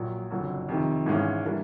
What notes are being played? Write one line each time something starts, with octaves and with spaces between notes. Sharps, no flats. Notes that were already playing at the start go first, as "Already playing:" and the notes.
Already playing: A#1 A#2 F#3
F#1 F2 D3 F#3
F2 C3 D#3
G#1 G#2 E3 G#3 C#4
E3 G3 A#3 D4